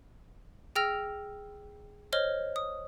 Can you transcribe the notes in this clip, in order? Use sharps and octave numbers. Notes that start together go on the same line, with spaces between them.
G#4 G5 E6 F6 A#6 F7
C5 C#5 D#5 F6 G7
D#6